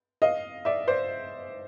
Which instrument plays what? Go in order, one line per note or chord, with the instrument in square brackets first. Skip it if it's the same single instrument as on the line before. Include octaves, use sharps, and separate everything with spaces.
[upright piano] D#5 F5
D5 E5
C5 D5